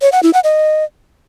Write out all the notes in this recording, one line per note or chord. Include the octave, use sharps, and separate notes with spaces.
C#5
F#5
E4
F#5
D#5